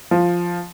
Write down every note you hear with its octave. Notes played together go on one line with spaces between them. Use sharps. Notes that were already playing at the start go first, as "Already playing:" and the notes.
F3